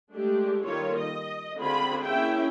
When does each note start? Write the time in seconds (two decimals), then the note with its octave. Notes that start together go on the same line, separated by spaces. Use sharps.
0.14 G#3 A3 D4 G4
0.65 D#3 G3 A#3 F4 A4 C#5
0.98 D#5
1.58 D3 C4 D4 F4 G#4 B5
2.05 A#3 C#4 E4 G#4 E5 G5